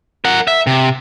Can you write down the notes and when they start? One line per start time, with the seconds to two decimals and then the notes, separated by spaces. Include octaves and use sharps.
0.25 A#4 F#5
0.47 E5
0.67 C3